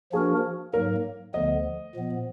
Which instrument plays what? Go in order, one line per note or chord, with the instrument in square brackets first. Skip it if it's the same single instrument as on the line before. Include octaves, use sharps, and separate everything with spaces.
[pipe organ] F3 A#3 D4 F#4 A#4 [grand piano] G#4
[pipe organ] G#2 F#3 A#3 [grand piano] A#4
[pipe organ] D2 D3 F3 B3 [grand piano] D#5
[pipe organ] A#2 F3 B3